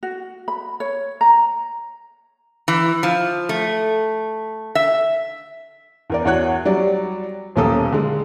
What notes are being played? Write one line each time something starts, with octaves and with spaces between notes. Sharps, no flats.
F#4
B5
C#5
A#5
E3
F3
A3
E5
E2 A#4 D5
E2 F#4 C#5 F#6
F#3 G3 D5
D#1 B1 A#3 C#4 A4 D#6
D3 G#3